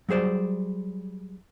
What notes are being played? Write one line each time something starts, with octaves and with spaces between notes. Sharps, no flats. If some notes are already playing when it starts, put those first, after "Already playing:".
F#3 G3 G#4 C5 D5